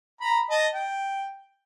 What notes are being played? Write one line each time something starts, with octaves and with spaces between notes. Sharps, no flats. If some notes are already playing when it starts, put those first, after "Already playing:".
A#5 B5
D#5 A5
G5